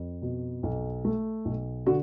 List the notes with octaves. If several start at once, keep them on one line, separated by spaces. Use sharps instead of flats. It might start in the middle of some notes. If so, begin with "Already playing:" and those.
Already playing: F2
B2
B1
A3
B1
D3 F#4